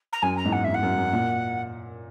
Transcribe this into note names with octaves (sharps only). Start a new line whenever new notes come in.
A#5
F#2 G#5
A#5
E2 G#2
F#5
E2 E5
F#5
F#2
F#2
A#2